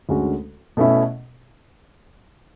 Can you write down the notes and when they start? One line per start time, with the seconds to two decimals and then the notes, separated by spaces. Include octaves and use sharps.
0.09 D2 D3 G#3 C#4 F#4
0.77 B2 A3 C#4 E4